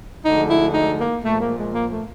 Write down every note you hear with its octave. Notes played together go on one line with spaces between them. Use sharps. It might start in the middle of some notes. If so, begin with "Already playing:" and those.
D2 D3 F3 G#3 D#4
E4
D#4
A#3
A#2 F3 G#3 A3
A#3
G#3
A#3
A3